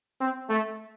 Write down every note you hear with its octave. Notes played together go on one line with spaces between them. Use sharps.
C4
A3